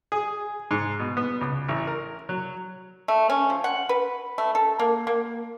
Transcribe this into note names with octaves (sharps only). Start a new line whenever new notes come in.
G#4
G#2
B2
B3
C#2
A1
A#4
F#3
A3
C#4
F3
F#5
B4
A3
A4
A#3
A#3